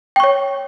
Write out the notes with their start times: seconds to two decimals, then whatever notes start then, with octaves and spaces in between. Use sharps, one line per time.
0.16 G5
0.20 C#6
0.24 C#5